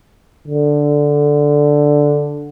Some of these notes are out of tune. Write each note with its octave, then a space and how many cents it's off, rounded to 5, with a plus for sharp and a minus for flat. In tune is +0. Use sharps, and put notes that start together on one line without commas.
D3 +0